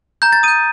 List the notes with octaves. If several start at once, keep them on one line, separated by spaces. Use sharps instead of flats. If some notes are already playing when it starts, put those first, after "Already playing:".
A#5 G6
A6
D#6 G6 D#7